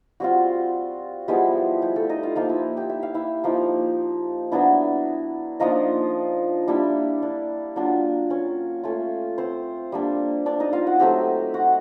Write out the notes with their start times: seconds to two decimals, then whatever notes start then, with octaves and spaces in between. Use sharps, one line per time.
0.20 G3 C4 F4 F#4
1.28 F3 G3 G#3 B3 E4 G4
1.82 G3 G4
1.96 A3 A4
2.09 D#4 D#5
2.23 F4 F5
2.36 F3 A#3 D#4 F4 F5
2.49 E4 E5
2.77 G4 G5
2.90 E5
3.03 F5
3.14 E4 E5
3.44 F3 A#3 D#4
4.52 F#3 B3 D4 E4 D5
5.60 F3 A#3 D4 D#4 F4 D#5
6.68 G3 A#3 D4 E4 E5
7.22 D4 D5
7.76 F#3 A#3 D4 F4
8.30 C#4 C#5
8.84 A3 C#4 F4
9.38 C4 C5
9.92 G3 A#3 D4
10.46 D4 D5
10.60 D#4 D#5
10.73 F4 F5
10.87 F#4 F#5
11.00 F#3 A3 C4 G4 G5
11.54 F#4 F#5